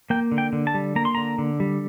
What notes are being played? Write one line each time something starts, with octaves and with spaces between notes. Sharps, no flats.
A#3 G5
D3
G5
D3
A5
G3
A#3 A#5
C6
D3 A#5
D3
G3